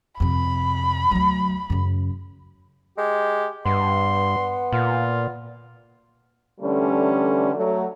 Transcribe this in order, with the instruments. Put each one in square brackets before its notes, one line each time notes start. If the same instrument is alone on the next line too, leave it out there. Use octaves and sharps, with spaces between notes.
[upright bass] F2 C3 [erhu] B5
[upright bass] D2 F#3
F#2 C#3
[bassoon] G#3 [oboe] G4
[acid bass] G2 [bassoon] B3 [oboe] C6
[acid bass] A#2 [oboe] F4
[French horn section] D3 E3 G3 A3 C#4
F#3 A3